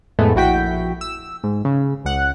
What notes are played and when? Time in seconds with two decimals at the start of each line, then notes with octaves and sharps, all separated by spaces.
0.19 F2 A2 G#3 A3 B3
0.35 A#1 E4 F#4 G5 B6
1.01 E6
1.44 G#2
1.65 C#3
2.05 C#2 F#5